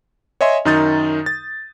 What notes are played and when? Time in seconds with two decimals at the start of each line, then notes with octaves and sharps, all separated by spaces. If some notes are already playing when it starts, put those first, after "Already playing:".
0.41 C#5 D#5 E5 G#5 C6
0.65 F#2 D#3 D#4 D#6 G6 A6
1.26 A6